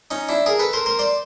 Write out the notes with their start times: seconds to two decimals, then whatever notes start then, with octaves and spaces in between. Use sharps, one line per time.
0.11 C#4 D#4
0.29 D4 E4
0.46 G#4 A#4
0.59 A4 B4
0.73 A#4 C5
0.86 A#4 C5
0.99 C5 D5